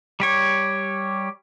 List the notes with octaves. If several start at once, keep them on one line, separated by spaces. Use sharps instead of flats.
G3 G4 C#5